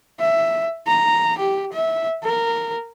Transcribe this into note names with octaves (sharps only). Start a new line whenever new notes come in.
E5
A#5
G4
E5
A#4